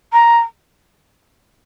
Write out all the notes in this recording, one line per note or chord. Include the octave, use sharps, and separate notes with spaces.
A#5